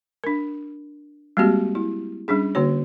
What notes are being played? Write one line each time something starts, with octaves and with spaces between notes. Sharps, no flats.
D4 A#4
G3 G#3 A#3 C4 F#4 G4
E4
G3 C#4 D4 G#4
D3 A#3 F#4 C#5